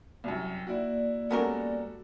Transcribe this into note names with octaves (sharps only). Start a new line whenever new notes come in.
C2 F#2 F#4 G5
A#3 E4 F#4 D5
G3 G#3 B3 C#4 F#4 A4 A#4